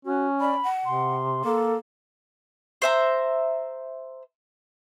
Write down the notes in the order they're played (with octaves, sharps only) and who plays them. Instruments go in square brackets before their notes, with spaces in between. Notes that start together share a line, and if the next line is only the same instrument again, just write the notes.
[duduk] C#4 [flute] F#4
[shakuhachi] D5 [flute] B5
[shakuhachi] F#5
[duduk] C3 [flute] C6
[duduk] A#3 [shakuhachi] A4
[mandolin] C5 E5 A#5